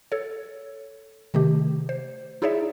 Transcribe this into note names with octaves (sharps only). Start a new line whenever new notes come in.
A4 C#5
C3 D#3 A3 G4
C5
D#4 E4 G#4 C#5 D5 E5